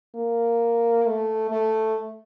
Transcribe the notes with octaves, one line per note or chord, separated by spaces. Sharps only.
A#3
A3
A3